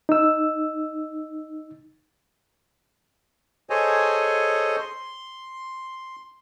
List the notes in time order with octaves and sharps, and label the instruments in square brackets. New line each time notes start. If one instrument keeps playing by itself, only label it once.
[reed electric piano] D#4 E6
[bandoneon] G#4 A4 C5 C#5 D#5 G#5
C6